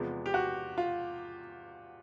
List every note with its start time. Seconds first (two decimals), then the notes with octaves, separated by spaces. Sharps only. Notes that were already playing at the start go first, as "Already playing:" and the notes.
Already playing: E2 C3 F3 G#3 B3
0.26 G4
0.34 F#4
0.78 F4